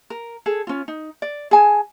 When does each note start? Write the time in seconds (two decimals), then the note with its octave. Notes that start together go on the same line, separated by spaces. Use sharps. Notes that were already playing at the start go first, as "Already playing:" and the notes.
0.10 A#4
0.46 G#4 A4
0.67 C#4 F4
0.88 D#4
1.22 D5
1.51 G#4 G#5 A5